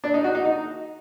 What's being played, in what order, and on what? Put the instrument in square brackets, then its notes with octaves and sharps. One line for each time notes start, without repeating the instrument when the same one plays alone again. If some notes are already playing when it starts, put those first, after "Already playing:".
[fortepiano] D4
D#4
F#4
D#4
D#4